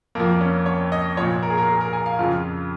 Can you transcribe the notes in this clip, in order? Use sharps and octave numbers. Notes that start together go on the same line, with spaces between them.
F2 F3 A#3
C#4
C#5
D#5
A#2 F3 C#5
A#4
G#4
A#4
G#4
A#4
G#5
F5
F2 C#3 F3 F4